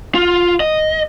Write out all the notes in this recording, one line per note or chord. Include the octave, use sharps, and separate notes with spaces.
F4
D#5